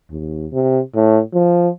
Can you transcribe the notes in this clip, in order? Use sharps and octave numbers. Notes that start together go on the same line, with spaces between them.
D#2
C3
A2
F3